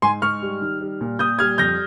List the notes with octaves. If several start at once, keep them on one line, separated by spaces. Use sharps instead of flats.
G#2 G#5 C6
G#2 C#6 F6
G3
D#3
G3
A#2
A#2 D#6 G6
G3 F6 G#6
F2 G6 A#6